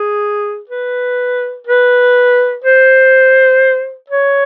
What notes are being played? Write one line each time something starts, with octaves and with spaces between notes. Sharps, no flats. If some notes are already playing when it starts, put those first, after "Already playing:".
Already playing: G#4
B4
B4
C5
C#5